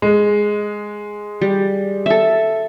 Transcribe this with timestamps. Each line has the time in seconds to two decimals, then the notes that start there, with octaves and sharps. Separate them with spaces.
0.02 G#3
1.41 G3
2.06 A4 E5